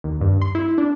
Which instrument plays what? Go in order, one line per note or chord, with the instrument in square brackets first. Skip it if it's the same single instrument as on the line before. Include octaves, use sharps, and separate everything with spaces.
[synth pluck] D#2
G2
C6
E4
D4